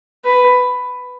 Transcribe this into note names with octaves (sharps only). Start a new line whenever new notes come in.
B4